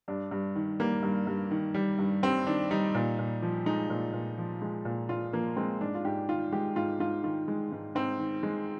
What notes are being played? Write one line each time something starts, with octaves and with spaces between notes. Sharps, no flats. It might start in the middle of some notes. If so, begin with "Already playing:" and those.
G2 D4
G2
D#3
G3 A#3
G2
G2
D#3
G3
G2
G2 C4
D#3 D4
G3 D#4
A#2
A#2
F3
G#3 D#4
A#2
A#2
F3
G#3
A#2
A#2 F4
F3 A#3
G#3 C4
G#2 D4
F4
G#2 G4
D#3 F4
G#3 G4
G#2 F4
G#2 F4
D#3 F4
G#3
G#2
G#2 C4
D#3
G#3